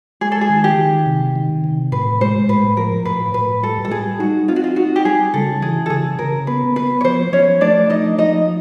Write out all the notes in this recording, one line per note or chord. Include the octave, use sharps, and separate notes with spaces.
G#3 G#4
A4
G#4
D#3
G4
D#3
C3
D#3
C3
A2 B4
G#3 C5
A2 B4
F3 A#4
A2 B4
A2 B4
G3 A4
A4
G3 G#4
D#4 F#4
C4 F4
F#4
F4
D#4 F#4
G4
G3 G#4
C#3 A4
E3 G#4
A4
C#3 G#4
C#3 A#4
B3 B4
B3 B4
C#5
F3 C5
F3 C#4 C#5
A3 D4 D5
F3 D#4 D#5
F3 D#4 D#5